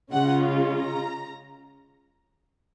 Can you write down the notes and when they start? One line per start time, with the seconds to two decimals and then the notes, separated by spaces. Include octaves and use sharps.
0.12 C#3 G#3 C#4 F4 F#5
0.74 A#5